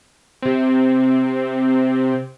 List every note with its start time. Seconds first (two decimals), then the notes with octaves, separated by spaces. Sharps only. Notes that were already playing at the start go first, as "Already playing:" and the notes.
0.42 C3 C4